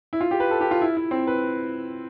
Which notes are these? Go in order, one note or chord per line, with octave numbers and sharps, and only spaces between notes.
E4
F4
G4
B4
A4
G4
F4
E4
E4
C4
B4